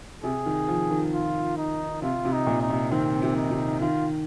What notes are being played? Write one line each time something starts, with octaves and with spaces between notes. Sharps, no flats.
C3 G#4
D#3
F3
D#3
F4
D#4
C3 F4
C3
D#4
A#2
D#4
C3
D#3 C4
C3
D#4
C3
D#3 F4